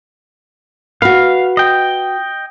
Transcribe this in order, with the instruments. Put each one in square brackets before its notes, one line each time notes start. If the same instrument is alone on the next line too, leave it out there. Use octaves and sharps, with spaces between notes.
[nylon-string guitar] F#4 B4 [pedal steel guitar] F5
[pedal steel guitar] D#5 G5